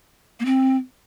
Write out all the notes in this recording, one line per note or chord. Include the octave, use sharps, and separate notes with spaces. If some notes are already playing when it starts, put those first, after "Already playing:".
A#3
C4